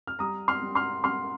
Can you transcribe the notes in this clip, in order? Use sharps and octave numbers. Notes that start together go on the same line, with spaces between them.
F6
G3 A#5 D#6
C6 F6
G3
C6 F6
G3 C6 F6